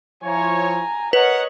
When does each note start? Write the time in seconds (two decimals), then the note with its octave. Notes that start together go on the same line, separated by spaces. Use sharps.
0.24 F3 E4 C#5 G#5 A#5
1.13 A#4 B4 C#5 D#5 F#5